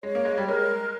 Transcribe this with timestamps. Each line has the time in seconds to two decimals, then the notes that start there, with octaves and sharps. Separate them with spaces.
0.03 G#3 C#5
0.15 A#3
0.25 G#3
0.37 G3
0.48 G#3 A#4